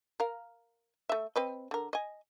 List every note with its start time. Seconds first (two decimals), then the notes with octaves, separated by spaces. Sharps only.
0.20 A#4 F5
1.09 A3 E5
1.36 C4 B4 D#5
1.71 D3 A#4
1.93 D#5 G#5